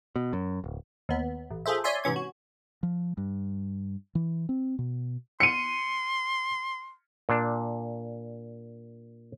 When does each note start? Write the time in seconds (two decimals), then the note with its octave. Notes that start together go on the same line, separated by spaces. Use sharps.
0.16 B2
0.33 F#2
0.64 D1
1.09 D#2 B3
1.50 A1
1.66 F4 G#4 A4 C5 E5
1.84 C#5 D5 E5 G#5 C6
2.04 G#2 C3 E3 C#4 G#6
2.16 F#4
2.83 F3
3.17 G2
4.15 E3
4.49 C4
4.79 B2
5.40 C6 C#7 D#7
7.29 A#2 D4